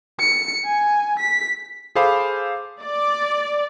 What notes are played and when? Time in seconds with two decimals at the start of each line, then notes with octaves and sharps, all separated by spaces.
0.20 C#7
0.65 G#5
1.19 B6
1.95 G#4 A4 C5 F5 B5 D6
2.82 D5